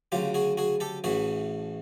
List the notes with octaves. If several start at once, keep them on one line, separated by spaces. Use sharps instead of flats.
D2 C#3 F#3 F4 G4
F#4 G#4
F#4 G#4
G4 A4
A1 A2 E3 F#4 G#4